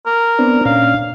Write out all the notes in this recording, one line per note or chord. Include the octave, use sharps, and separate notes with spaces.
A#4
B3 C4 D4
A#2 C#4 D4 F5